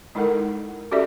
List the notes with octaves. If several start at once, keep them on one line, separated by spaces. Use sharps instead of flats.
G#3 D#4 E4 A4 A#4 F#5
C#4 F#4 G4 A4 D5 E5